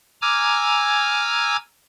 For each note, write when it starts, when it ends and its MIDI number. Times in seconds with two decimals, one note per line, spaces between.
0.22 1.57 80
0.22 1.57 82
0.22 1.57 86
0.22 1.57 88
0.22 1.57 89
0.22 1.57 92